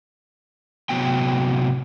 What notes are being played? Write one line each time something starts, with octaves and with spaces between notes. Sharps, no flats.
A2 C3 F#3 B3 G5